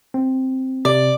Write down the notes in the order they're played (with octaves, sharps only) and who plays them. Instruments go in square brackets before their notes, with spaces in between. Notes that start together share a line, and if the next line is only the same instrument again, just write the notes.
[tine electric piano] C4
[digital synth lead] C3 [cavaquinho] D5